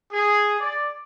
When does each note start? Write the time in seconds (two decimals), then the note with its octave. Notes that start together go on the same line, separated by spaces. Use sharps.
0.11 G#4
0.60 D5